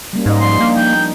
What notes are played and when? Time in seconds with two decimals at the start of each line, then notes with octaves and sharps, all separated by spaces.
0.13 G3 A#3 C#4
0.26 G#2 D#4 D#5
0.40 F3 G3 D5 C6
0.60 A#3 D4
0.76 F3 D#4 G5